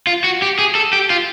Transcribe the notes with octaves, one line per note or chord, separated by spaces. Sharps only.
F4
F#4
G4
G#4
A4
G4
F4